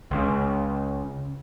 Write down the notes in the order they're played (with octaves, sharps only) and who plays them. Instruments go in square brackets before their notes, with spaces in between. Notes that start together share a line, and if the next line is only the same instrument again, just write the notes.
[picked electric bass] C#2 C#3